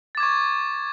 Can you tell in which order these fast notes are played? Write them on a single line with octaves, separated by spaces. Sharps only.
A6 D6 G#6 C#6